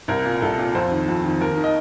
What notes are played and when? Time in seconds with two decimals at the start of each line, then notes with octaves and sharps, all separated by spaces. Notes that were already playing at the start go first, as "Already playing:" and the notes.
0.08 C2 A#4
0.25 A#2
0.42 C2 A4
0.58 A#2
0.75 F2 C5
0.91 D#3
1.08 F2
1.25 D#3
1.41 D#2 A#4
1.57 D#3
1.64 D#5